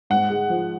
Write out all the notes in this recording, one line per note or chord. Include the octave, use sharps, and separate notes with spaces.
G#2 F#5
G#3
F3